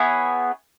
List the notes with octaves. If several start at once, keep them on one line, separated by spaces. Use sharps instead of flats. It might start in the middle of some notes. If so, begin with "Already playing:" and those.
Already playing: B3 E4 G#4 C#5